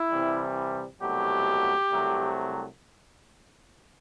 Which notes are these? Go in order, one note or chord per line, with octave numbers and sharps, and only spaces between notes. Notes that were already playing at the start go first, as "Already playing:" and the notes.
Already playing: E4
C2 C3 E3 G3
C2 B2 F#3 A3 G4
C2 C3 F#3 A3